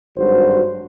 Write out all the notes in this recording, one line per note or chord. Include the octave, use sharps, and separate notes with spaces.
G#1 G2 F#3 F#4 C5